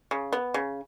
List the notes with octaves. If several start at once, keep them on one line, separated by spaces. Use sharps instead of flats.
C#3
B3
C#3